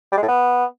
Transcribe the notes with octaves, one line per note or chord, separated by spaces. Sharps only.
G3
G#3
A2
B3